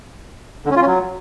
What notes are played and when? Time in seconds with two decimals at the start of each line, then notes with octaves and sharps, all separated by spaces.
0.66 D3
0.71 C#4
0.76 F4
0.81 C#4
0.87 F#3